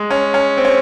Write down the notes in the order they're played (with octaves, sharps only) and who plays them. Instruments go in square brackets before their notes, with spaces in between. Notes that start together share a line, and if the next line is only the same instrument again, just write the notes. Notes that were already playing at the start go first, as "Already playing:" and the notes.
Already playing: [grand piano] G#3
C#4
C#4
C4
C#4